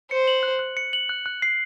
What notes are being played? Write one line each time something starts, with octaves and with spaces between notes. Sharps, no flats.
C5 C#7
F#7
F#6
F#6
C#7
F#7
F#6
F#6
C7